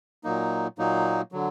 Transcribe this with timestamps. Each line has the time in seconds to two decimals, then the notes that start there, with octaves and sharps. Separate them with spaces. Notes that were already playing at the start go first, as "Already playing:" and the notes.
0.24 A#2 F#3 A#3 D#4
0.79 A#2 F#3 A#3 D#4
1.32 D3 F#3